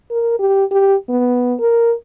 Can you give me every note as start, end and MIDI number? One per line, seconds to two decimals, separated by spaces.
0.11 0.36 70
0.39 0.64 67
0.72 0.95 67
1.09 1.55 59
1.60 1.93 70